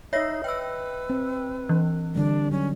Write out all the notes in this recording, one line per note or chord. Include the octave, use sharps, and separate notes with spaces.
D#4 C#5 D#5 E5 A#6
B4 G5 E6
C4
E3
D3 G3 D4
F#3 C#4